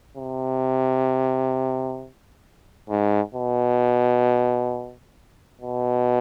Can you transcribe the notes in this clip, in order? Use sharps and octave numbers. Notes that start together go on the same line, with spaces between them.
C3
G#2
B2
B2